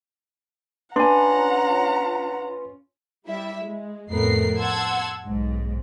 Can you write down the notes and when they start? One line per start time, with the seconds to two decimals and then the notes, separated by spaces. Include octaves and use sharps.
0.96 C#4 D4 F4 B4 F#5 G#5 A#5 C6
3.27 G3 E4 E5
3.64 G#3
4.10 F2 A2 A3 B3 A#4 C7
4.59 F#5 A5 C6 E6 G#6
5.26 B1 G#2